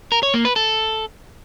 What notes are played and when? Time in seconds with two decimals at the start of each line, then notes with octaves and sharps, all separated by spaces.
0.12 A#4
0.23 C#5
0.34 A#3
0.45 B4
0.56 A4